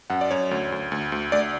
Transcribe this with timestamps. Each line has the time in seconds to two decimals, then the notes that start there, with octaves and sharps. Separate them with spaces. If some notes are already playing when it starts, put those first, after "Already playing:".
0.10 F#2 F#5
0.21 D5
0.31 F#2 C#5
0.51 D2
0.72 D2
0.92 D2
1.12 D2
1.32 D2 D5